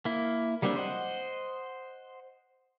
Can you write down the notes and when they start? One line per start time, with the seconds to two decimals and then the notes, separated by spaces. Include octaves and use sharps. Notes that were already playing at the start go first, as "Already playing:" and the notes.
0.05 A#3 E4
0.62 F#3 G3 A#3 C4 D4
0.76 C5 D#5 F#5